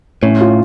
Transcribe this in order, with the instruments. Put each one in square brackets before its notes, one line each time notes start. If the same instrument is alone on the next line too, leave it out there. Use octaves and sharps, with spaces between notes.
[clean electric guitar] A2 [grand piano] C#4
[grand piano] F4